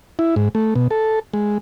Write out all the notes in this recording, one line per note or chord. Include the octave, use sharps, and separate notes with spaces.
E4
G#2
A3
B2
A4
G#3